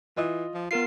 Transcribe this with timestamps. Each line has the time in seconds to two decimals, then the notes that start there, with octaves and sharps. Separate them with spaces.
0.17 E3 F4 D#5 D#6
0.54 F3
0.71 B3 F4 A#4 C7